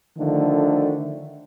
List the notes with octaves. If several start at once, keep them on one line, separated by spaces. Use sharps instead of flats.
D3 D#3 F3 A3